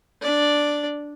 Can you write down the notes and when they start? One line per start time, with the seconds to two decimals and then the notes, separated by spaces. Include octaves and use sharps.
0.22 D4 D5